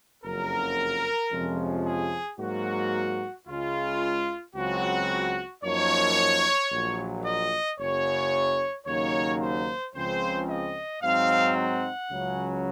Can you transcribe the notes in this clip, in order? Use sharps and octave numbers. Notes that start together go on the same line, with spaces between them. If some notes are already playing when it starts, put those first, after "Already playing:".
F#1 F2 C#3 F#3 A#4
F2 C3 F3 G#3 C#4
G#4
G#2 F#3 A#3 F#4
C#2 C#3 G#3 F4
C#2 C#3 F#3 C4 F#4
F#2 F3 A#3 D#4 C#5
A#1 A#2 F#3
D#5
F#1 F#2 C#3 C#5
D#2 C#3 F#3 A#3 D#4 C#5
C5
C#2 C#3 F3 C4 C5
D#5
G#2 F#3 C4 D#4 F5
F#5
C#2 C#3 F#3 C#4